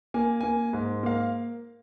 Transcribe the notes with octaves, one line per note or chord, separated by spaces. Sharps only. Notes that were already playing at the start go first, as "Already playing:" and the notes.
A#3 G#5
A#3 G#5
G#2
A#3 F5